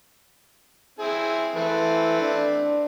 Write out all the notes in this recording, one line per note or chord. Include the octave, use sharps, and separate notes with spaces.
C4 E4 G#4
E3 A3 C4 B4
D4